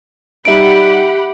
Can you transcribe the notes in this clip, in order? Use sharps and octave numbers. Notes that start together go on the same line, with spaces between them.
G3 D#4 G4 E5 F#5 B5 D7